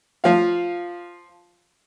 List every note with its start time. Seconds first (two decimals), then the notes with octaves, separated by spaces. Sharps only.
0.24 F3 F5